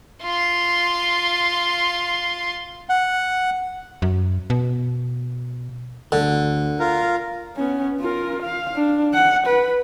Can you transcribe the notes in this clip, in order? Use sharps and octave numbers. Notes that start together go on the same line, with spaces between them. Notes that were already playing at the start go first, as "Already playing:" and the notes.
F4 C6
F#5
F#2
B2
D2 D3
F4 A#4
B3 C#4
F4 A#4
F5
D4
F#5
B4